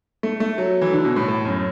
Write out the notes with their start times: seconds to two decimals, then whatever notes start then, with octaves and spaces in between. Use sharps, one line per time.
0.23 A3
0.40 A3
0.58 F#3
0.82 E3
0.93 D3
1.04 B2
1.16 A2
1.28 A2
1.45 F#2